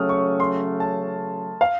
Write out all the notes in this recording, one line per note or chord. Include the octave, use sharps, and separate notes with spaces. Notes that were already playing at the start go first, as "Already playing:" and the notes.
Already playing: C#3 F#3 A3 C#4 D#6 F6
C#6
C6
A5
F5